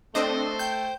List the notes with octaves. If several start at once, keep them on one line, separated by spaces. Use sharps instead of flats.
A3 C4 D4 A4 C5 D#5
G5 G6